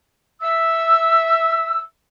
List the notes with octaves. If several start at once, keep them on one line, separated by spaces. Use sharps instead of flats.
E5 E6